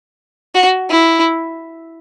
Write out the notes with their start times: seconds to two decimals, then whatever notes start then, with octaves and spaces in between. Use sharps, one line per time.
0.55 F#4
0.90 E4